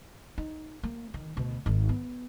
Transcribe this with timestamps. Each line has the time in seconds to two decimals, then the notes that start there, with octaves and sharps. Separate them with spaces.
0.38 D#4
0.83 A#3
1.14 D#3
1.37 D2 B2
1.66 G#1 D#3
1.89 B3